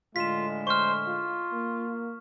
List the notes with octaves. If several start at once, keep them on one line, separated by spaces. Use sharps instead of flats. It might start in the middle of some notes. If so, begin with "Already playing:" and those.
A2 D3 G#3 F4 B6 E7
C5 C#6 F6
F4
A#3